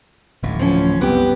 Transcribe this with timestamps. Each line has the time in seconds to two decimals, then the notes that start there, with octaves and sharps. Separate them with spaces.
0.42 D1 A1 A2
0.59 F3 C#4
1.01 C2 F#2 B3 G4